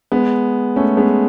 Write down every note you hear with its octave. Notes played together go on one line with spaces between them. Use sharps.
G#3 B3
A3 C#4
G#3 B3